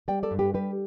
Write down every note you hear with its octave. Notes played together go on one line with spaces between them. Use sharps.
G3 D5 G5
A4 D5
G2
G4 B4
G3 G4 B4